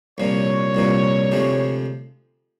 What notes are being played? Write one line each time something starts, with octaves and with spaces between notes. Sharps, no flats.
C2 A#2 F3 C#5
C2 A#2 F3
D2 C3 F3 G#3